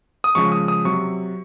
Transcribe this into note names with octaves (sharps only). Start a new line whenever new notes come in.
D#6
C#3 F3 G#3 C#6
D#6
D#6
C3 F#3 C#6